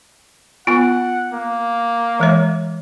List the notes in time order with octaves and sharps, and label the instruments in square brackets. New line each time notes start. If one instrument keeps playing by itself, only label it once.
[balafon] B3 F4 [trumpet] F#5
[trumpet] A#3
[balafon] E3 G#3 C#5